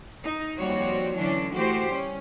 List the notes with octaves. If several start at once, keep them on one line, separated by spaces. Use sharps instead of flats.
D#4
D#2 F3 G3 C4 F#4 C#5
D3 E3 F#3 C#4 D4
E3 A3 F#4 G4 C5
G3 C#4